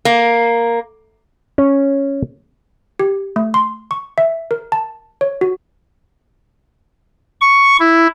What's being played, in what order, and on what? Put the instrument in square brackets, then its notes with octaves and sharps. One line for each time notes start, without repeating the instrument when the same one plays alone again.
[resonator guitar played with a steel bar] A#3
[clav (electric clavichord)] C#4
[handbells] G4
A3
C6
C#6
E5
A#4
A5
C#5
F#4
[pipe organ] C#6
E4